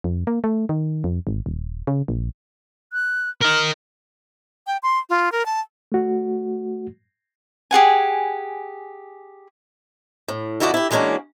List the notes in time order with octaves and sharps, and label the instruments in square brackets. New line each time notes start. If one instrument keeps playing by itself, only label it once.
[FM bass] F2
A#3
A3
D#3
F2
G#1
D#1
C#3
A#1
[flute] F#6
[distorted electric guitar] A#4 D#5 [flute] F6
[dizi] G5
C6
F4
A#4
A5
[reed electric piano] A3 F#4
[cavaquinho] G4 G#4 F#5 G#5
[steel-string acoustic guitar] A2
F2 D3 E4 F#4 D5 D#5
E4 G4
E3 G#3 A#3 C#4 D4 F#4